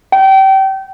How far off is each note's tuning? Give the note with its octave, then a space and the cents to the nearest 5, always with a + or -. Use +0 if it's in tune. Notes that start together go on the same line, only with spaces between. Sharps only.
G5 -30